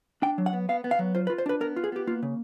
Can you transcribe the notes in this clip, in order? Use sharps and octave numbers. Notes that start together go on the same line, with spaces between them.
D4 G5
F#3
F#5
B3
B3 F5
B3
F5
F#3
F4 C5
B4
F4
C5
D4 B4
B3 A#4
F4
G#4
B3 G4
A#3 F4
C#3